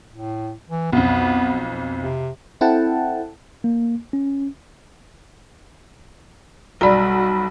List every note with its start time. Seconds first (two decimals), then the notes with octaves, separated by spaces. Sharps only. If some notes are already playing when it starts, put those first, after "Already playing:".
0.12 A2
0.69 E3
0.93 B1 F2 B3
2.01 C3
2.61 C4 E4 A4 F#5 G5 A5
3.64 A#3
4.13 C#4
6.81 B1 G3 F#4 D5 A#5 B5